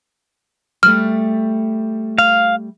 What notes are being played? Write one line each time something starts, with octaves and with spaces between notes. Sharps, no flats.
G3 A3 F6
F5